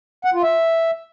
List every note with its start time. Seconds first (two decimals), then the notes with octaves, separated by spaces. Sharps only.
0.25 F#5
0.34 F4
0.43 E5